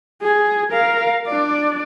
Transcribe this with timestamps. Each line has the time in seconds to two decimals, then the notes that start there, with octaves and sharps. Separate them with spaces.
0.22 G#4
0.71 A#4 F5
1.27 D4 D5